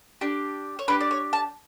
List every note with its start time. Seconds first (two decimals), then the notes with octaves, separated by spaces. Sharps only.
0.21 D4 G4
0.79 C#5
0.88 D4 G4 B4
1.01 D5
1.11 C#5
1.33 A5